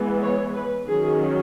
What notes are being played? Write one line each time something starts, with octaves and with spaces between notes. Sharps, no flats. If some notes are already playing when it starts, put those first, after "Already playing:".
Already playing: E3 G#3 B3
C#5
B4
D#3 F#3 C#4 G#4